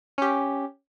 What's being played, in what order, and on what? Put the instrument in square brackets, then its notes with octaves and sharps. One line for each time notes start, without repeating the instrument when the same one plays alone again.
[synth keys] C#4 G4